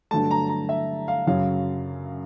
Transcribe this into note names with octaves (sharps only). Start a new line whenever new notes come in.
G2 D3 F#3 A3 A5
A#5
A#5
E5
F5
F#2 C#3 F#3 F5